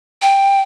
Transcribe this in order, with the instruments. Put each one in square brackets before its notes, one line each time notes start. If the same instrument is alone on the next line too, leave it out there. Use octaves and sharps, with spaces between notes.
[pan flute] G5